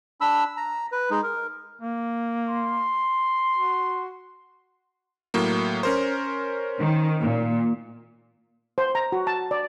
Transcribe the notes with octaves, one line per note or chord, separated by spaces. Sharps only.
D4 B5 E6
A#5
B4
G#3 D#4
A#4
A#3
C6
F#4
A2 F#3 A#3
C#4 A#4 C5
D#3
A#2
C5
A#5
F#4
A5
D5